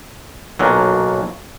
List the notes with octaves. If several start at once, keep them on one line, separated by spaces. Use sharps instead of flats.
B1 A#2 F#3